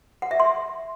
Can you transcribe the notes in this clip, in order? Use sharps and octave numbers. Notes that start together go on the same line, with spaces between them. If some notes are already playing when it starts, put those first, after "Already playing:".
F#5
E5
C6